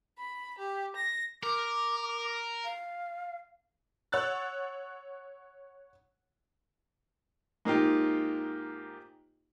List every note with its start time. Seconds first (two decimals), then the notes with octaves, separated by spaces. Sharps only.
0.18 B5
0.58 G4
0.95 A#6
1.43 A#4 D6
2.65 F5
4.12 C#5 F#5 E6 F#6 A6
7.65 G#2 A#3 D#4 F4 G4